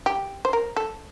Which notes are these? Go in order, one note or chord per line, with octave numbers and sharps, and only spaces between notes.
G4
C5
A#4
A4